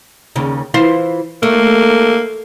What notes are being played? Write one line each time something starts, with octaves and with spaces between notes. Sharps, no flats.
D#2 C#3
E3 F4 C5
A3 A#3